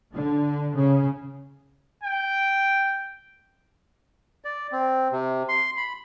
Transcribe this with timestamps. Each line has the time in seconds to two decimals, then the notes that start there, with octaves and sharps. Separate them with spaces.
0.12 D3
0.73 C#3
2.04 G5
4.44 D5
4.72 C4
5.12 C3
5.48 C6
5.77 B5